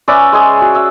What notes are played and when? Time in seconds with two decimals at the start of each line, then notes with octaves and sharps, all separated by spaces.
0.08 C#4 B4 D5 E5
0.32 G#3 G#4
0.61 F#4
0.75 E5